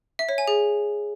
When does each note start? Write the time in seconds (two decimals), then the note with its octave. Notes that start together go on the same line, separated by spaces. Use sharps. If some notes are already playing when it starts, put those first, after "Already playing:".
0.19 E5
0.29 C#5
0.38 G#5
0.48 G#4